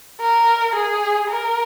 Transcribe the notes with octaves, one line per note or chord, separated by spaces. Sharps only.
A#4
G#4
A#4